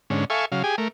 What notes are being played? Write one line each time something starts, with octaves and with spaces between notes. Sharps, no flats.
G#2 D3 C#4
A4 E5 F5 G#5 C#6
C#3 F#3 F5
G4 G#4 G#5
A3 A#4